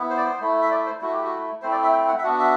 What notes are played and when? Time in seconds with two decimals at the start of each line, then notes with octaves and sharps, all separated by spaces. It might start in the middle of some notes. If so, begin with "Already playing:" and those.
Already playing: B3 E4
0.10 C5
0.17 D5
0.24 C5
0.41 A3 E4
0.61 E5
0.71 D5
0.86 C5
1.01 A3 E4 F#4
1.12 G4
1.23 F#4
1.62 A3 C4 E4 C5
1.72 D5
1.82 E5
1.92 G5
2.08 F#5
2.18 E5
2.23 B3 D4 F#4 F#5
2.39 E5